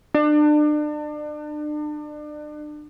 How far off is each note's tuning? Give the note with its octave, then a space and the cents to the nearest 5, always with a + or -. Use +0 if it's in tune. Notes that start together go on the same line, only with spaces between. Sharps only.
D4 +35